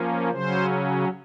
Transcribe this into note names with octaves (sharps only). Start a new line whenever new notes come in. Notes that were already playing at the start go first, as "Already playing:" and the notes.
Already playing: F3 A#3 C#4
C#3 F#3 C#4 C5